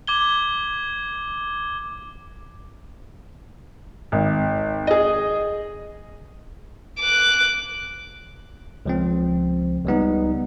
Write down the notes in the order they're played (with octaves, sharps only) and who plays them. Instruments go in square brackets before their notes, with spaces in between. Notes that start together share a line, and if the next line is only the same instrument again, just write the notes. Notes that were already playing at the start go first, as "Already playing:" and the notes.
[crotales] D6 G#6 G7
[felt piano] G#1
G#4 D#5
[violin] D6 F#6
[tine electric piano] C#2 F3 C4
C#2 G3 B3 D#4